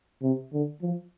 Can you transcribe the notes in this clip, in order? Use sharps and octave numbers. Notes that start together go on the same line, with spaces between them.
C3
D3
F3